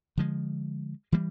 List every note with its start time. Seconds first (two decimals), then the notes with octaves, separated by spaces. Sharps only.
0.17 D3 F3 G#3
1.12 E3 G3 A#3